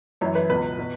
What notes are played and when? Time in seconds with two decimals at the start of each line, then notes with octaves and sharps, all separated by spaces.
0.21 F#2 E3 C#5
0.35 B4
0.49 C#2 B2 B4
0.79 B2